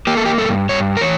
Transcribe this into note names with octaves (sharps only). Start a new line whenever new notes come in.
A#3 G4
A4
G4
G2 A4
G2 C#5
A#4
E3 C#5